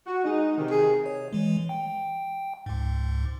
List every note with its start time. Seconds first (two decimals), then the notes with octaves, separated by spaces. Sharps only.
0.06 F#4
0.24 G#3 D#4
0.57 C3 D#3
0.71 G#4
1.06 C#5
1.33 E3 G#3
1.69 G5
2.66 C#2 G#2